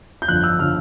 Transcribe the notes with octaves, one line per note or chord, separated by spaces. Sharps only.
G6
G1 F2 D3 F3 F#6
E6
D3 F3 F6